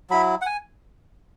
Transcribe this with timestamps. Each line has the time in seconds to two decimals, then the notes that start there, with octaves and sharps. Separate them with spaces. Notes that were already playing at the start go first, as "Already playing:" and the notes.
0.10 F#3 E4 B5
0.41 F#5
0.46 G#5